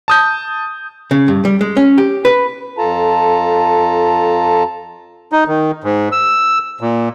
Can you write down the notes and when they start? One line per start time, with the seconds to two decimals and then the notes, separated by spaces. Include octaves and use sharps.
0.08 A5 D#6 G6
1.11 C#3
1.28 G2
1.45 G3
1.61 G#3
1.77 C#4
1.98 G4
2.25 B4
2.78 F2 F4 A4 A5 A#5
5.32 D#4
5.48 D#3
5.84 G#2
6.12 E6
6.81 A#2